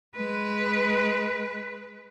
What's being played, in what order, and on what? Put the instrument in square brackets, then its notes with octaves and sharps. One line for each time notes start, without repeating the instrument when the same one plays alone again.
[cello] G#3 B4